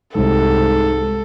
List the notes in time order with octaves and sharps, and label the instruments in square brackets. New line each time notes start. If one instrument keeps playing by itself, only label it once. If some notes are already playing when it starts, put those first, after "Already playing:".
[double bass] C2 [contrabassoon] G#2 [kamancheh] A4